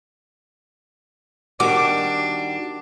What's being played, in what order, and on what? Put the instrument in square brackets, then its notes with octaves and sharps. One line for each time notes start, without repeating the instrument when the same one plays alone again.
[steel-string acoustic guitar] D#3 G3 F#4 [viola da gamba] D4 [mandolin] D6